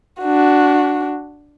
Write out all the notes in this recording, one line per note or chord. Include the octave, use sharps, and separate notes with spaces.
D4 F#4